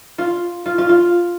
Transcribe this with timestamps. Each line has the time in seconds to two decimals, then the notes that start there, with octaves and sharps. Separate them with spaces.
0.18 F4
0.66 F4
0.78 F4
0.89 F4